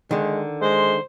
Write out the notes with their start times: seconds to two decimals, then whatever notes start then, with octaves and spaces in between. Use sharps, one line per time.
0.11 D3 D#3 G#3
0.62 G#3 C5